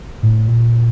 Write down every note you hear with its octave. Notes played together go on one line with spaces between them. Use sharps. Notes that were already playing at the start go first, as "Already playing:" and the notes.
A2
A#2